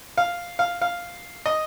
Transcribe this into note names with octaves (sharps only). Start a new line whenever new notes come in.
F5
F5
F5
D#5